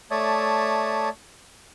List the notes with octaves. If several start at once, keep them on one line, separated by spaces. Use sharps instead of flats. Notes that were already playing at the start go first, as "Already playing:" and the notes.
A3 C#5 D5 E5 A5 D#6